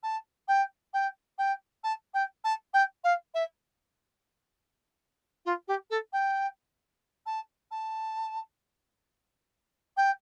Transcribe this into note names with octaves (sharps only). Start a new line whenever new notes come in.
A5
G5
G5
G5
A5
G5
A5
G5
F5
E5
F4
G4
A4
G5
A5
A5
G5